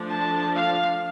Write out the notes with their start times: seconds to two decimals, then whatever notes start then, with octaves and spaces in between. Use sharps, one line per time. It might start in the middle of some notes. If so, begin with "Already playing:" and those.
Already playing: F3 A3 D4
0.10 A5
0.55 F5